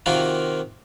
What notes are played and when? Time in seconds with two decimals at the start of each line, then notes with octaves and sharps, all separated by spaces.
0.06 C3 D#3 A#3 F4 F#4